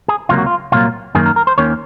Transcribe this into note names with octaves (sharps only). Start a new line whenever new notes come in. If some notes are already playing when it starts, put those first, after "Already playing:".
G#4
C#2 C3 F#3 A#3 F4
F#4
F4
C2 A#2 F#3 A#3 F4
F#2 D#3 A#3 G#4
A#4
A#4
C5
D#2 D#3 A#3 C#4 C#5